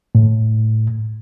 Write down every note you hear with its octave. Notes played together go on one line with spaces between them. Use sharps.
A2